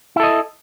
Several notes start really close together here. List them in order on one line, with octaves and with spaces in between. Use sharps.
E4 A4 D#5